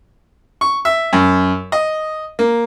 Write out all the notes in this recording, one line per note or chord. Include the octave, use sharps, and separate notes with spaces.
C#6
E5
F#2
D#5
A#3